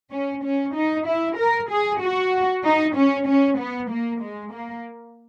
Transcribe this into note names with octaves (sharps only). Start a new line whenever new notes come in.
C#4
C#4
D#4
E4
A#4
G#4
F#4
D#4
C#4
C#4
B3
A#3
G#3
A#3